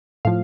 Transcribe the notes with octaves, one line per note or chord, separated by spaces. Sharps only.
A2 F3 F5